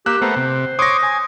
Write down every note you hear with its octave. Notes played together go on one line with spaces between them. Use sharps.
A#3 G4 E6 F#6
A3 B3 A#4 C5
C3
C#5 C6 D6 D#6 A#6
G#5